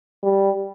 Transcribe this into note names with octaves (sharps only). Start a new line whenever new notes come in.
G3